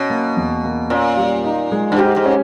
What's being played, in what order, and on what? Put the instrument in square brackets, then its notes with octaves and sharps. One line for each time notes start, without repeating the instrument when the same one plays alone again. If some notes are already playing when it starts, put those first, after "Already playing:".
Already playing: [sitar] B2 [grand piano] C#4
[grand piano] A#3
E2
A#3
[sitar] A#2 [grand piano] C#4
[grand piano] G3
D#4
G#3
[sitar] G2
[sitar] G#2 [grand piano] G4
[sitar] G#2
[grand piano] C#4